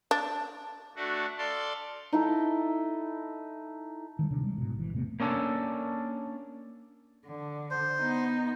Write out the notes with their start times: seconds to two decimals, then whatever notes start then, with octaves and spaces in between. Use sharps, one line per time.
0.11 D4
0.96 A3 D4 F#4
1.38 A4 D5 F5 C6
2.13 D#4 E4 A4
4.19 D#3 F#3 G3
4.30 D1 C3 D#3 D4
4.44 G3 G#3
4.58 G#2 B2
4.75 G#1 E3
4.93 E1 C3 A3 B3
5.20 A#3 C#4 D4 A4
7.26 D3
7.71 C5
7.99 B3 D#4